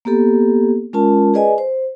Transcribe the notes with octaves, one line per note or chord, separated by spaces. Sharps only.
A#3 B3 G4 A4
G#3 C#4 F4 A#4 A5
G#4 B4 D5 D#5 G#5
C5